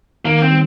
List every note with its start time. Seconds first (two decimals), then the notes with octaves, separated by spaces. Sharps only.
0.25 D#3 A#3
0.42 C4
0.50 G3